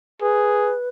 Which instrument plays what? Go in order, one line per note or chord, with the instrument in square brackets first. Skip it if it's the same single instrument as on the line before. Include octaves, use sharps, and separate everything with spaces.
[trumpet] G#4 [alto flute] B4